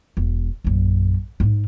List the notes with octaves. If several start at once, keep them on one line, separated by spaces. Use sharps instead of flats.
E1
A#1 F#2
G#2 D#4